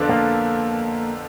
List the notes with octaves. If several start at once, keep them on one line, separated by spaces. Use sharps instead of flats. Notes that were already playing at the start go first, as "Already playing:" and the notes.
Already playing: F2 D3 F3 B3 D4
A#3